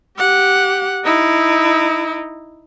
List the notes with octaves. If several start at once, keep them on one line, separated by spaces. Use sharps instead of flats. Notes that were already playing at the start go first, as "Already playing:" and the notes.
G4 F#5
D#4 E4